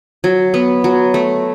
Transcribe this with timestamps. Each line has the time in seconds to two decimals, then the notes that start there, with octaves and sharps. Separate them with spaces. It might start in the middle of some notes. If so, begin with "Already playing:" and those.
0.24 F#3
0.54 B3
0.84 F#3
1.14 A3